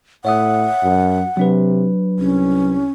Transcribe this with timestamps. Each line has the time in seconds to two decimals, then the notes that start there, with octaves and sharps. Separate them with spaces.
0.25 A2 C#5 E5 F#5 D#6
0.83 F#2
1.37 C3 F#3 D4 B4
2.19 C2 C#4